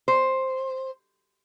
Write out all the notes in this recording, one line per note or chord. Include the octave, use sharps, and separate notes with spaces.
C5